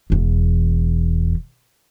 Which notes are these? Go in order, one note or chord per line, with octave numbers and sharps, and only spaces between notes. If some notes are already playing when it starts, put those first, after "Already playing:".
E1 E2